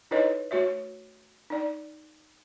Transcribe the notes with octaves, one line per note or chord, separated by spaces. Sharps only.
D#4 E4 A4 B4 C#5 D#5
A3 F#4 C#5 E5
D#4 D5